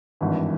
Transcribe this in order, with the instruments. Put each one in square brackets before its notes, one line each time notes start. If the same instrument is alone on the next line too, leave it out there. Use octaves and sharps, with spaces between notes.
[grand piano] G#1 G2 E3